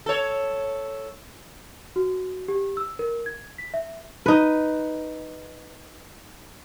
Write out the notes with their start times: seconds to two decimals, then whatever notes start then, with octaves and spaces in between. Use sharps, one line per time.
0.06 A4 C#5
1.96 F#4
2.48 G4
2.77 E6
2.99 A#4
3.26 G#6
3.58 B6
3.74 E5
4.26 D#4 B4